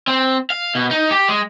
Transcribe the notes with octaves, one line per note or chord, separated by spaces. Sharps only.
C4
F5
B2
D#4
G4
G#3